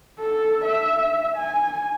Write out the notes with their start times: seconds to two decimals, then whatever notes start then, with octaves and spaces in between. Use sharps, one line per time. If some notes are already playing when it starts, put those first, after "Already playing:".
0.20 A4
0.65 E5
1.37 G#5